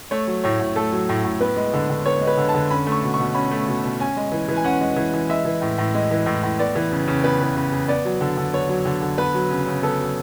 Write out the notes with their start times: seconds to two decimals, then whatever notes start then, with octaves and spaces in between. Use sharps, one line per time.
0.11 A3 C#5
0.27 F#3
0.44 A2 C#5
0.60 A2
0.76 A3 A4
0.93 F#3
1.09 A2
1.24 A2
1.41 B3 B4
1.57 G#3
1.73 D3
1.90 D3
2.06 B3 C#5
2.21 G#3
2.27 B4
2.37 D3
2.49 A5
2.54 D3
2.71 C#4 B5
2.87 A3
2.92 C#6
3.03 B2
3.14 C#6
3.19 B2
3.35 C#4 B5
3.51 A3
3.68 B2
3.84 B2
4.00 C#4 G#5
4.17 G#3
4.32 E3
4.49 E3
4.56 G#5
4.65 C#4 F#5
4.81 G#3
4.97 E3
5.14 E3
5.29 G#3 E5
5.45 E3
5.61 A2
5.78 A2
5.95 G#3
6.11 E3
6.26 A2
6.43 A2
6.59 B3 D5
6.76 E3
6.92 C#3
7.08 C#3
7.24 B3 B4
7.40 E3
7.56 C#3
7.72 C#3
7.88 B3 D5
8.05 F#3
8.21 D3
8.37 D3
8.53 B3 C#5
8.69 F#3
8.85 D3
9.02 D3
9.18 B3 B4
9.34 F#3
9.51 C#3
9.67 C#3
9.83 B3 A4
9.99 F#3